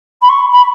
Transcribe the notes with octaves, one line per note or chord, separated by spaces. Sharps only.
B5
C#6
B5